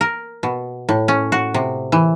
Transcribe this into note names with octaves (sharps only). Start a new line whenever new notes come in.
A#4
B2
A2
C#4
F#4
C3
E3